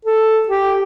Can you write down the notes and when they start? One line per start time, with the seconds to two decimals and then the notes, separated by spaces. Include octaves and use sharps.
0.05 A4
0.48 G4